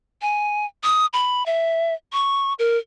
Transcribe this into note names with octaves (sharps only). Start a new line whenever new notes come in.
G#5
D#6
B5
E5
C#6
A#4